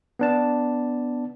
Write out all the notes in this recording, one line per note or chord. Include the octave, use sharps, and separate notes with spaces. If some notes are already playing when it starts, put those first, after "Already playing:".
B3 D4 A5